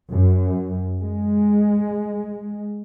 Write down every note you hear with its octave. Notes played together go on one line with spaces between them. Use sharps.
F#2
G#3